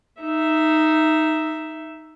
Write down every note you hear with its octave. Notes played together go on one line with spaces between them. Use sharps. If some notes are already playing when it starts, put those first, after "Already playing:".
D#4 E5